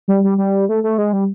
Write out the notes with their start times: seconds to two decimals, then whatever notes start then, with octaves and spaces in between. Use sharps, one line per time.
0.08 G3
0.24 G3
0.38 G3
0.69 A3
0.84 A3
0.98 G#3
1.13 G3